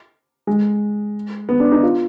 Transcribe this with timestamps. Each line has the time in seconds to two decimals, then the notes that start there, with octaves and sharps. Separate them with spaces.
0.47 G#3
1.49 B3
1.60 D4
1.72 D#4
1.83 F4